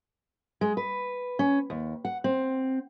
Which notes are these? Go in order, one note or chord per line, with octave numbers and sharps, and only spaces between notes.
G#3
B4
C#4
D#2
F#5
C4